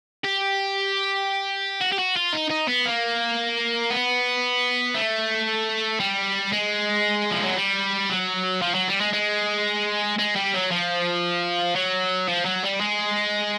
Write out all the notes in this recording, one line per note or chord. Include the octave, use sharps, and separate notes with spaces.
G4
F#4
G4
F#4
F4
D#4
D#4
B3
A#3
B3
A3
G3
G#3
F3
F#3
G3
F#3
F3
F#3
G3
G#3
G#3
G#3
G3
F#3
F3
F#3
F3
F#3
G3
G#3